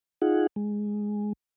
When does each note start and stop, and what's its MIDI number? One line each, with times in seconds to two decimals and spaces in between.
0.22 0.47 63
0.22 0.47 65
0.22 0.47 68
0.22 0.47 78
0.56 1.33 56